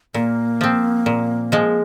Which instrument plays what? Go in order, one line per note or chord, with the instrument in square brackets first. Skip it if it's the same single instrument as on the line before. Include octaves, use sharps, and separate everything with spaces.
[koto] A#2 [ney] A#3
[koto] F3 C4
A#2
F3 G#3